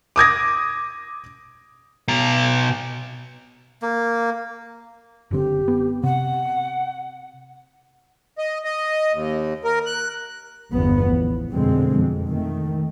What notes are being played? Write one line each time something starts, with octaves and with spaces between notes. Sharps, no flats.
D6 D#6 G#6 A#6
B2 A#5
A#3
F#1 D3 C4 G4
B3
C3 F#5
D#5
D#5
D#2
A#4
F#6
G1 E2 F3 B3
A1
F1 F#2 B2 D3 G#3 C4
F2
D#3 A3